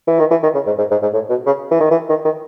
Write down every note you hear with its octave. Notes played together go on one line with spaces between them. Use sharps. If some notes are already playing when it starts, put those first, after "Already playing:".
E3
D#3
E3
D#3
C#3
G#2
G#2
G#2
G#2
A2
B2
C#3
E3
D#3
E3
D#3
D#3